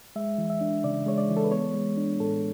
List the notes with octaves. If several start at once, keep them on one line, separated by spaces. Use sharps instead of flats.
G#3 E5
E3
E5
D4
C#3 D5
G#3 C#5
D5
E3
A4
B4
B3 C#5
G#3
D4
A2 A4